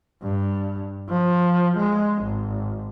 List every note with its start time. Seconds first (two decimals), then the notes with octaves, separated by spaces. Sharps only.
0.23 G2
1.09 F3
1.78 G#3
2.23 G#1